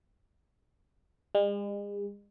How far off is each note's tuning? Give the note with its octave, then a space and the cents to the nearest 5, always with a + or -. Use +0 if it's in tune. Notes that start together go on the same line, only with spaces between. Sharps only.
G#3 -45